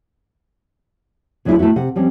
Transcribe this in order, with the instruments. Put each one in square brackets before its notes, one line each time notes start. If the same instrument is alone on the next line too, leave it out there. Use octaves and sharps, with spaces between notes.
[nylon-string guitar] D2 F#3 G#3 D4 E4 F4
A3 B3 E4 F#4
C3 F#5
F3 G3 C4 C#4